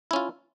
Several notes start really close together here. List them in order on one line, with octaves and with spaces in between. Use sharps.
E4 C#4 F4